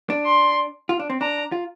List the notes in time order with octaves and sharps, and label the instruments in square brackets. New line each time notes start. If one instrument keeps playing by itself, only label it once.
[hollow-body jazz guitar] D4
[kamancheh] C6
[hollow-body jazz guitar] F4
D4
C4
[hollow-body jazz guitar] D4 [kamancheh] A#5
[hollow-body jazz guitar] F4